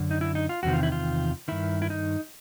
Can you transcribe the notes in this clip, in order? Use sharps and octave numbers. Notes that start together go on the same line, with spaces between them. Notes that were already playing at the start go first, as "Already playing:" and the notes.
Already playing: F#2 D3
D#4
E4
D#4
F4
E2 C3 D#3 F#4
F4
E4
F4
G2 D#3 E4
E4
D#4